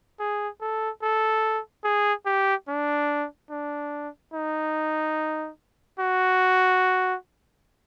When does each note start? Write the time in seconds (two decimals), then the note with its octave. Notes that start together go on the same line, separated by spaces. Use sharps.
0.20 G#4
0.61 A4
1.03 A4
1.84 G#4
2.26 G4
2.69 D4
3.51 D4
4.34 D#4
6.00 F#4